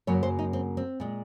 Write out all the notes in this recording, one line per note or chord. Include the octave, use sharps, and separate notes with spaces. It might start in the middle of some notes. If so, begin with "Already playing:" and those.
F#2 C#3 F#3 A#3 C#5
C5
D#4
C4
C4
A#2 G#3